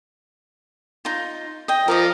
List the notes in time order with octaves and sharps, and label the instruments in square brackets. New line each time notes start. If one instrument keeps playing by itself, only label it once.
[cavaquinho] D#4 F4
D#5 G5
[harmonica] F3 [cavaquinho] A#4 D5 D#5